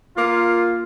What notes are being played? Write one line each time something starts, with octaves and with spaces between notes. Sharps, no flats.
A#3 F4